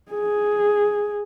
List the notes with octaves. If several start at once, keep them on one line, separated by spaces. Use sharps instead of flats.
G#4